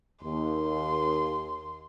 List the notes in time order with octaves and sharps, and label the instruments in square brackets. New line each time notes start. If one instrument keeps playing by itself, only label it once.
[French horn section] D#2 [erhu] C6